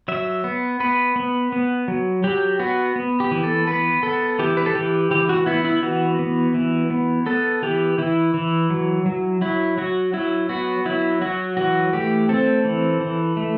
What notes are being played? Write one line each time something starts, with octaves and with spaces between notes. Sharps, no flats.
F#3 E5
B3
B3 B4
B3
B3
F#3
F#3 G4
B3 F#4
B3
G4
E3
A4
B3 B4
B3 A4
E3 G4
B4
A4
E3 G4
E3 G4
F#4
B3 E4
E4
E3 F#4
B3
E3
B3
B3 A4
E3 G4
E3 E4
E3
F#3
F#3
F#3 E4
F#3 F#4
F#3 E4
B3 F#4
F#3 E4
F#3 F#4
E3 F#4
A3 G4
C4 A4
E3
E3
A3